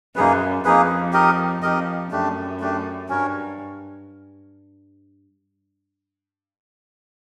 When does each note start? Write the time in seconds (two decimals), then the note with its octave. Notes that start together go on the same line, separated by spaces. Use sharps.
0.16 F#2 A#3 D#4 G#4 B4
0.64 F2 A#3 D#4 G#4 B4
1.13 D#4 G4 A#4 D#5
1.62 F2 D#4 G4 A#4 D#5
2.11 F#2 A3 D4 G4
2.60 A3 D4 G4
3.09 G2 C#4 F#4 A#4 C#5